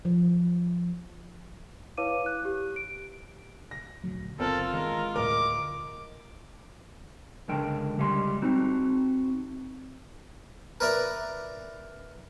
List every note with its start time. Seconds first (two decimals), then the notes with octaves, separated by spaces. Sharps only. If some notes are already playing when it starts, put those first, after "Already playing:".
0.05 F3
1.97 E4 B4 C#5 F5 D6 D#7
2.26 F#6
2.45 G4
2.76 D7
3.71 A#6
4.04 D#1 D2 F#3
4.40 F#1 C4 F4 A4 A#4
4.74 D#3 E3 G#3 A#4
5.16 D2 A2 A#4 D#5 D6
7.48 C#2 D3 G#3 A#4 G5
7.98 C#2 G3 G#3 F5 C6
8.42 C4 D#4 F#4
10.80 A#4 B4 D5 E5 A#5